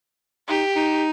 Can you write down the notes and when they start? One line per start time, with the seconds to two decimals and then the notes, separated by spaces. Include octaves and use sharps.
0.49 D#4 G4
0.76 D#4